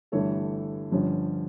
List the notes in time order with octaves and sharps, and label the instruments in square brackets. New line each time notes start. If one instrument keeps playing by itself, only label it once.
[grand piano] G1 G2 E3 A3 A4 C#5
G1 G2 F3 C#4